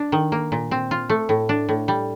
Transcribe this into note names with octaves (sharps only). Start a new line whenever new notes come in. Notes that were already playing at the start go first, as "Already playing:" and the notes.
Already playing: D4
D#3
A#3
A#2
C4
F4
A3
A2
D4
A2
G3